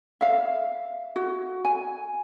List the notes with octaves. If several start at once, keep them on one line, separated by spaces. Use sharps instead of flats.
E5 F5
F#4
G#5